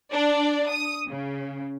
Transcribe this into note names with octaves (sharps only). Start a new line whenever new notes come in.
D4 D5
D#6
C#3